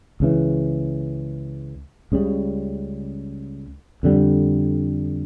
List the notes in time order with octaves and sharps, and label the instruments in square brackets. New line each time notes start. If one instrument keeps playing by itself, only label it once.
[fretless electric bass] C#2 C#3 E3
C#2 C#3 G3
F2 D3 G3